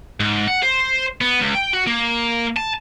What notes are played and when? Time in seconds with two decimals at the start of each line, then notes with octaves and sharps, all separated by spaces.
0.20 G#2
0.48 F#5
0.63 C5
1.21 B3
1.41 C#2
1.54 G5
1.73 F#4
1.87 A#3
2.57 A5